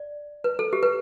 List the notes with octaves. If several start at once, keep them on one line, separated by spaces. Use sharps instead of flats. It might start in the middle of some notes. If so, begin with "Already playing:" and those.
Already playing: D5
B4
A4
G4
B4